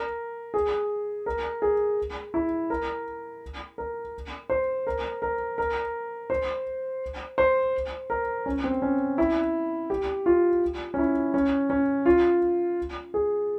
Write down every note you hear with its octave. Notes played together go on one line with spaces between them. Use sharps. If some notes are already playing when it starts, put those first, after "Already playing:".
Already playing: A#4
G#4
A#4
G#4
E4
A#4
A#4
C5
A#4
A#4
A#4
C5
C5
A#4
C#4
C4
C#4
E4
G4
F4
C#4
E4
C#4
C#4
F4
G#4